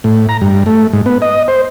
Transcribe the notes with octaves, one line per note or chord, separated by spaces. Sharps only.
A2
A#5
G2
A3
G#2
B3
D#5
C5